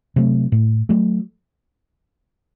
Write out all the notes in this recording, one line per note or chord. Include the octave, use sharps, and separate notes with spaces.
C3 F#3 A3
A2
F#3 A3